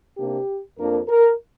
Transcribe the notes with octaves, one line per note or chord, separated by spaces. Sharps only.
C3 A#3 D4 G4
F2 F3 A#3 D4 A#4
A#4